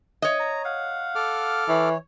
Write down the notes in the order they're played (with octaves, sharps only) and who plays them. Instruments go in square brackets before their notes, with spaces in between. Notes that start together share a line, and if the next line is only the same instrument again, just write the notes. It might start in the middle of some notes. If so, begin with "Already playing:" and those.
[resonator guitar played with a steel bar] C#5 D#5
[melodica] A#5
F5 F#5
[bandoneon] A4 D6 F6
[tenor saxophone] E3 [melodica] C#5